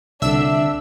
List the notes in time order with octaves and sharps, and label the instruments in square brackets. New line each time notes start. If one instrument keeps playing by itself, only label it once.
[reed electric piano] C2 D3 [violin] D4 [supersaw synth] E5 E6